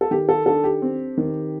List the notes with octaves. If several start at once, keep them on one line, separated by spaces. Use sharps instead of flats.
A4
D#3 G4
A4
D4 A4
G4
C4
D#3